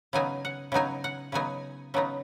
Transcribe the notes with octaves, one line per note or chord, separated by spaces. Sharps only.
C#3 F#3 B3 D#4 G#5
F#5
C#3 F#3 B3 D#4 G#5
F#5
C#3 F#3 B3 D#4 G#5
C#3 F#3 B3 D#4